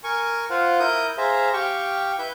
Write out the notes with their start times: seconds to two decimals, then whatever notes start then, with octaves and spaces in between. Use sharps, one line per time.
0.04 A#4 G#5 C#6
0.50 F4 C5 F5 F#5
0.80 E4 A#4 D#6 G6
1.18 G#4 C5 E5 F5 A#5
1.53 G4 F5 G5 C#6
2.18 E4 B4 E5 G6